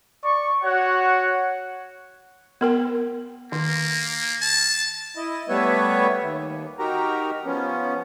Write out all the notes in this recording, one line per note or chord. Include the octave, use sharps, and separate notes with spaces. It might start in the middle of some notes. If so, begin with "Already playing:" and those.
D5 C#6
F#4 C#5 F#5
B3 A#4 G5
D#3 A#3
A5
E4 D#5
G3 A3 B3 B4 C#5 E5
D#2
D#4 F#4 G4 A#4 A#5
F3 B3 C#4